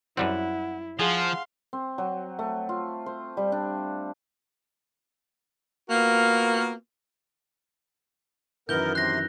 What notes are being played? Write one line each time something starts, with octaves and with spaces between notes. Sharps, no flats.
F#2 G3 C4 E4 F#5
F3 G#4 F5 F#5 C6
C4
F#3
A3
F4
C5
G3
D4
A#3 B3 F4 F#4 A#4
F#2 D#3 E3 B3 A#4 G6 G7
C3 C6 F#6 A#6